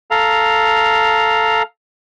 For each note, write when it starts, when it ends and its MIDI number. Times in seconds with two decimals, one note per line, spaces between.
0.11 1.63 69
0.11 1.63 77
0.11 1.63 82